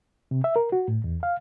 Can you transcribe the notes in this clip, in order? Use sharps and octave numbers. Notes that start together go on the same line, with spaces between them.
C3
E5
A#4
F#4
A2
E2
F5